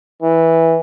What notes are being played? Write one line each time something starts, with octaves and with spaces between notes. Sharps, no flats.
E3